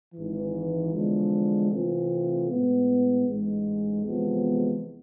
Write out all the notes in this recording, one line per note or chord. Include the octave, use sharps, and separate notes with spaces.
G#1 G#2 E3
E2 D3 F3 G#3
C3 E3 A3 C4 F4
A2 G#3 B3
A1 G#2 G#3
E2 C3 F3 G#3 B3